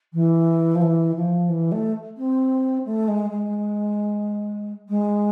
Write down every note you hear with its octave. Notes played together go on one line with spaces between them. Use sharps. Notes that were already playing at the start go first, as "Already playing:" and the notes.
E3
F3
E3
F3
E3
A3
C4
A3
G#3
G#3
G#3